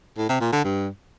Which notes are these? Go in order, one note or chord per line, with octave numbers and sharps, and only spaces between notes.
A2
C3
A#2
D3
G2